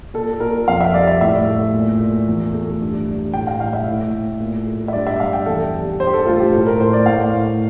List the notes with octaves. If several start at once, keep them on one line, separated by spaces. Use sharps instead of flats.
A#2 A4
A#2 A#4
F2 F5
E5
G3 D5
E5
A2 E5
A3
A#2
A#2
E2
A3
G2
G3
A2 G5
F5
A2 F5
E5
A2
A2
A#2
A3
E5
G2 D5
E5
G3 F5
G5
E2 A4
G3
G2 C5
G4
A4
A3 F4
G4
A2 A4
A#4
A2 C5
D5
A2 F5
A2